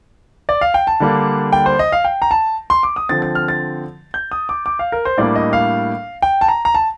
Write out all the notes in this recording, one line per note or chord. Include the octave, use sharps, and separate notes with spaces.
D5
F5
G5
A5
D3 G3 A#3 D4
G5
C5
D#5
F5
G5
A#5
A5
C6
D6
D#6
D3 F3 C4 A6
A6
F6
A6
G6
D#6
D6
D6
F5
A#4
C5
A2 G3 A#3 D4 D5
D#5
F5
G5
A5
A#5
A#5
A5